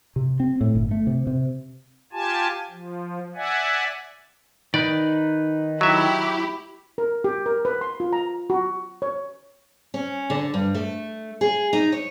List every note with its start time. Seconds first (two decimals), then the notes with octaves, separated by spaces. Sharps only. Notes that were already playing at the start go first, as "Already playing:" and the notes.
0.16 C3
0.40 C4
0.61 A2
0.75 G1
0.91 A3
1.07 C3
1.27 C3
2.13 F4 G4 G#5 A5
2.70 F3
3.35 D5 E5 F#5 G#5
4.74 D#3 D#4 B4 D5
5.81 F#3 E4 G4 E5
6.98 A#4
7.24 G4
7.46 A#4
7.65 B4
7.81 C6
8.00 F4
8.13 A#5
8.50 F#4
9.02 C#5
9.94 C#4
10.30 D3
10.54 G2
10.75 A3
11.41 G#4
11.73 D#4
11.92 C#5